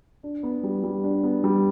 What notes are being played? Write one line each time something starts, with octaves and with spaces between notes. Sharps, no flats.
D4
B3
G3
G3
D4
B3
G3